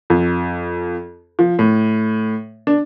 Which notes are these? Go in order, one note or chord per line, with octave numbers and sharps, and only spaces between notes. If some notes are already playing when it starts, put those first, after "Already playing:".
F2
F3
A2
D4